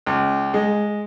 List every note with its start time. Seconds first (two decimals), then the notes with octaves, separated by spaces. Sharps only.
0.06 C#2
0.54 G#3